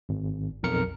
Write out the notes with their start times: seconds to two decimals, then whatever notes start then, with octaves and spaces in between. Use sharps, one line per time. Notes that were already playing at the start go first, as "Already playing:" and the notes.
0.09 G#1
0.63 B1 F2 A#4 C#7